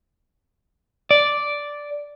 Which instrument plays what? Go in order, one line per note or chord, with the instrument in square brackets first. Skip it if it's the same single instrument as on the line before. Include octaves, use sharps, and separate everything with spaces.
[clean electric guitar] D5